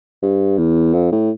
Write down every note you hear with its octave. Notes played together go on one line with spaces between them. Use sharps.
G2
E2
F2
A2